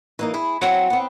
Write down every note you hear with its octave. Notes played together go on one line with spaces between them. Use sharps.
E3 A#3 D#4
E4 G#4
F#3 C4 F#5
B3 C4